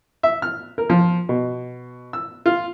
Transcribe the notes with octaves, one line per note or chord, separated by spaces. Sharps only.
E5
F6
A#4
F3
B2
E6
F4